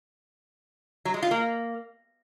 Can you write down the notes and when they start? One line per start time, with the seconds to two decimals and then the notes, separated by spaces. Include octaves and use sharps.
1.05 F#3
1.14 G#3
1.22 F4
1.31 A#3